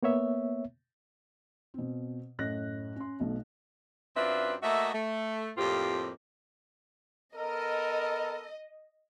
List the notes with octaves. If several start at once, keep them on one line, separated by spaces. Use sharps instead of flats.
A#3 B3 C#5 E5
B2 C4
F#2 A2 D#5 F#6 A#6
C#4 C6
B1 B2 A3
F#2 C4 D4 F4 B4 E5
A3 A#3 F#4 D#5 E5
A3
F2 A2 A#3 C4 F4 G4
B3 A4 A#4 D#5